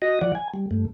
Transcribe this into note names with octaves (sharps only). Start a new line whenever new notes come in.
F#4 D#5 A#6
E3 F3 D5 F#5
G#5
G3
G2 A3